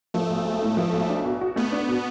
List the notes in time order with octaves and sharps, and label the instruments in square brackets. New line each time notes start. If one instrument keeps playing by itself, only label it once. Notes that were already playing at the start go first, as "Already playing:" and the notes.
[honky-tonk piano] F3 [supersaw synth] A3
[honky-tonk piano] B1
G#3
A2
F3
B1
D4
B2
F#4
[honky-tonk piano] A3 [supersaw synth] B3
[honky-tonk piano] D4
B2